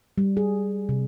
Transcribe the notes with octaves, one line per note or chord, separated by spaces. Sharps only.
G3
G#4
C3